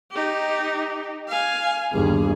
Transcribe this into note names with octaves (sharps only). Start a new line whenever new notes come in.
D#4 G4
F5 G#5
G1 D#2 G#4